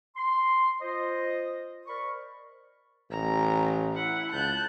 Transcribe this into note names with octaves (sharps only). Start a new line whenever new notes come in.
C6
F4 C5 D#5
A#4 C5 D5 B5 C#6
A1 A#5
E4 F#5
C#2 A5 F#6 G6